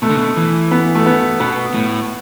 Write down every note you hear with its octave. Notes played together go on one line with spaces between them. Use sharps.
B2 A3
D3
B2
E3
B3
A3
B3
B2 B3
A2